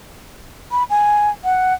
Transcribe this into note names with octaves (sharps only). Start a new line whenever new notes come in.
B5
G#5
F#5